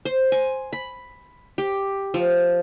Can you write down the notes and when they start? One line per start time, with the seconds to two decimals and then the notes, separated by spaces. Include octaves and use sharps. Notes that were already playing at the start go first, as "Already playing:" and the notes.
0.05 C5
0.32 G#5
0.73 B5
1.58 G4
2.14 F3